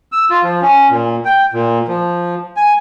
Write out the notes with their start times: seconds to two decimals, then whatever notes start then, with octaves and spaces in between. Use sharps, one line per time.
0.12 E6
0.30 F4
0.43 F3
0.62 C#4
0.90 A#2
1.25 G5
1.53 A#2
1.88 F3
2.56 G#5